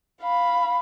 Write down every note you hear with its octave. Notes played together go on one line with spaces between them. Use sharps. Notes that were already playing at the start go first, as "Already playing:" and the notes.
F5 B5